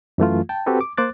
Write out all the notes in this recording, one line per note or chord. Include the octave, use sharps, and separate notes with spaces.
F#2 E3 A3 F4
G5 A5
C4 F#4 G4 A4 B4
D6
A#3 C5 D6 F#6 A6